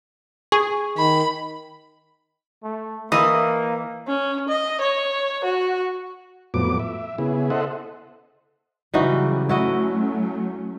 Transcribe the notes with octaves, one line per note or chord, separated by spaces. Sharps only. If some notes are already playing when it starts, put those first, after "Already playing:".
G#4 C#6
D#3 B5
A3
E3 A#3 D#5
C#4
D#5
C#5
F#4
F2 A2 F#3 B3 D6
E5
C#3 B3 E4 G#4
A4 C5 D#5 E5 F#5
C#3 E3 F#3 G3 D#4 F#4
F#3 A3 C#4 E4 F#4 D#5